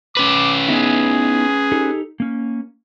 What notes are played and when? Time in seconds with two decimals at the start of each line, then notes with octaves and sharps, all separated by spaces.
0.17 C#4 B4 D6
0.69 B3 D#4 E4 G#4
1.72 D#4 G4 A4
2.20 A#3 C#4